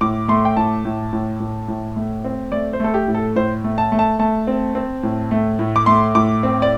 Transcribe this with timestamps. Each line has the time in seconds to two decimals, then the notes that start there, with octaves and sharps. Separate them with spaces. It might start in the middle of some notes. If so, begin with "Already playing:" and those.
0.01 A2 D6
0.28 A3 C6
0.45 G5
0.57 A2 A5
0.85 A2
1.13 A2
1.40 A2
1.68 A2
1.96 A3
2.24 C4
2.52 A3 D5
2.73 C5
2.80 A3 A4
2.94 G4
3.08 A2
3.15 A4
3.36 A2 C5
3.64 A3
3.78 A5
3.92 A3
3.99 A5
4.19 A3 A5
4.47 C4
4.75 C4
5.03 A2
5.31 A3
5.59 A2
5.76 D6
5.86 A3 C6
6.15 A2 D6
6.43 C4
6.62 D5